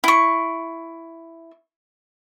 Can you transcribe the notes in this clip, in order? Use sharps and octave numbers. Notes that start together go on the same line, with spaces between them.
E4 C#6